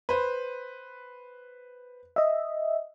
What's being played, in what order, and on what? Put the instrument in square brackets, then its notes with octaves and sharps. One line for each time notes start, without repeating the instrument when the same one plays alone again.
[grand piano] B4 C5
[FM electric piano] D#5 E5